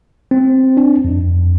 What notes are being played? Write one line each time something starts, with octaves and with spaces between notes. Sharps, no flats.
C4
D4
F2